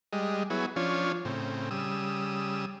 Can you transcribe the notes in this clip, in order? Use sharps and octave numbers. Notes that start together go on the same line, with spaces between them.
G3 G#3 D#5
F#3 B3 E4 G#4 C#5
F3 C#4 D4 F4 C#5
A2 C#3 C4
C#3 G3 D#6 E6